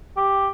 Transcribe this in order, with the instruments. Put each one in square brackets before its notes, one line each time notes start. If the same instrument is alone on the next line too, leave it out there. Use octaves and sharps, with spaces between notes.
[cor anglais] G4